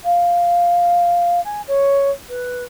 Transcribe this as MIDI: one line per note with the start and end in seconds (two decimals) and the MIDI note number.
0.04 1.40 77
1.44 1.61 80
1.67 2.10 73
2.28 2.63 71